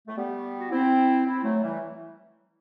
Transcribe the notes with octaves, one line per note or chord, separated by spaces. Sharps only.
A3
G3 B3
F#4
C4 E4
C4 E4
F#3 A3
E3 G3